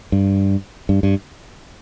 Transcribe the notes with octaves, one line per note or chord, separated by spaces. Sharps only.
G2
G2
G2